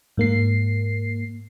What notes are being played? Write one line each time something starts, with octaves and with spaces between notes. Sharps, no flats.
G#2 A#3 C7